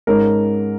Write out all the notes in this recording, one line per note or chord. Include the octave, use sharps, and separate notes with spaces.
G#2 G#3 C#4 A#4